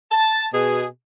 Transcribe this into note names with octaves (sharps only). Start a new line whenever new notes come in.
A5
B2 G#4